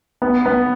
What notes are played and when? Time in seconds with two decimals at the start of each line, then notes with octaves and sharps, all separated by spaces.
0.22 B3
0.46 B3